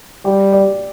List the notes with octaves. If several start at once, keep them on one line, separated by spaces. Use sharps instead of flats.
G3 G4
D5